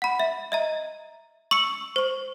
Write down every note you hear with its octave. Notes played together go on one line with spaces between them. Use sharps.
F#5 B5
E5
D#5 E5 A#5
C#6 E6 C#7
C5 C#6